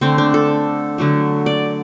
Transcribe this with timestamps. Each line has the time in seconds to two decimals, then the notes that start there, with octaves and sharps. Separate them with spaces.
0.01 D3 A3 C4
0.18 D4
0.34 A4
0.98 D3 F#3 A3
1.46 D5